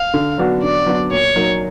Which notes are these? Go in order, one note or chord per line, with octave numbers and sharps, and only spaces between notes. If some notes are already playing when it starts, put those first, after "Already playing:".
Already playing: F5
D3
F#3 B3 D4 F#4
D3 D5
F#3 B3 D4 F#4
A#2 C#5
F#3 A#3 D#4